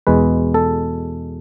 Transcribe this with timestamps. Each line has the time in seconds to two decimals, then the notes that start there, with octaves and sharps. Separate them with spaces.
0.07 E2 B2 G#3 B4
0.54 A4